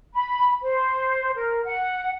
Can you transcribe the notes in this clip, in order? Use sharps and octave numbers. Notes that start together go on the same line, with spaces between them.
B5
C5
A#4
F#5